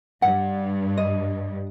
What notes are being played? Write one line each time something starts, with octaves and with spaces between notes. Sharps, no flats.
G2 F#5
D#5